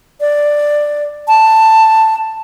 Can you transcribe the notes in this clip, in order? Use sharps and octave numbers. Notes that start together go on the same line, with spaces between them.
D5
A5